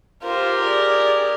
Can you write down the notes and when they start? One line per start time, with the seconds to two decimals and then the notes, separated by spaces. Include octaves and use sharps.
0.23 F4 G4 A#4 C5
0.65 G#4 D5